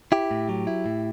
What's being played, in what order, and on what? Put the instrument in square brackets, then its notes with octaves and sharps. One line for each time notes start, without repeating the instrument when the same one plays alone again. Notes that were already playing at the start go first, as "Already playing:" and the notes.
[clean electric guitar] E4 G4
A2
F#3
E4
A2